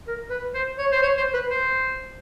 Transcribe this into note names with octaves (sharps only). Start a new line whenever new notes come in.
A#4
B4
C5
C#5
C5
C#5
C5
B4
C5